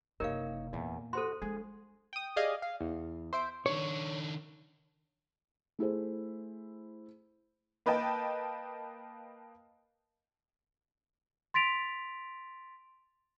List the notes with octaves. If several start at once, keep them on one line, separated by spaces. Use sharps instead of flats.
F#1 C3 D#4 A#4 C#5 F5
E2 A#2 E3
F#4 A4 C5 C6
G#3 D4 G#4
G5 D#6
G4 G#4 D5 D#5 F5 G#5
F5
E2
C5 E5 D7
D#3 D4 C#5
A3 E4 G#4 C5
A#3 B4 D#5 G5 A5
C6 A6 B6 D7 F7